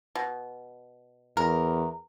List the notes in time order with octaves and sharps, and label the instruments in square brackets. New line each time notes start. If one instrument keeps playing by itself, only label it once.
[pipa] B2
[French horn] E2 [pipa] A#4